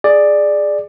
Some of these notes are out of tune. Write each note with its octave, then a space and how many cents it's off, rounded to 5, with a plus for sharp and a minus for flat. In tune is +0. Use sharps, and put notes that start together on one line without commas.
G#4 +0 D5 +10